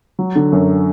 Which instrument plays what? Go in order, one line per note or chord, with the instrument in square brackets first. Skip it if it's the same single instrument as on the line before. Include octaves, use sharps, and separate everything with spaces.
[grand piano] F#3
D3
F#2